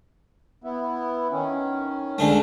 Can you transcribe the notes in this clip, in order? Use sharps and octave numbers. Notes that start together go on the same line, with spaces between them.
B3 E4
D#3 C#4
C#2 D3 A3